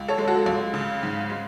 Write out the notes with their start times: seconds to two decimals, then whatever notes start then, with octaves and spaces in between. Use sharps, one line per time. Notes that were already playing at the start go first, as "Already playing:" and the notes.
Already playing: C#2
0.08 A4 C#5
0.18 G#3
0.28 F#4 A4
0.46 C#2
0.74 C#3
1.03 G#2
1.30 G#3